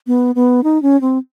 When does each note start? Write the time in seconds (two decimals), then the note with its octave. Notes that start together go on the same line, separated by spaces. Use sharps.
0.07 B3
0.35 B3
0.64 D#4
0.82 C#4
1.01 C4